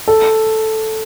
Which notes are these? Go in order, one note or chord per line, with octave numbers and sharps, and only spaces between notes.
A4